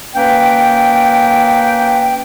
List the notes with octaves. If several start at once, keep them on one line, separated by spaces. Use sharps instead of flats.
A#3 C#4 B4 G5